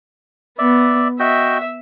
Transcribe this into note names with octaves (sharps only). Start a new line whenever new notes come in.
B3 D5 E5
F#4 D#5 E5 G5